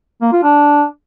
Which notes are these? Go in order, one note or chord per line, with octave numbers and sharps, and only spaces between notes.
A#3
F4
D4